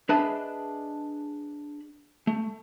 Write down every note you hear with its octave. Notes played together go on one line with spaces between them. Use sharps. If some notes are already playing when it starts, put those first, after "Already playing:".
D4 G#4 B4 D#5 E5 A5
A3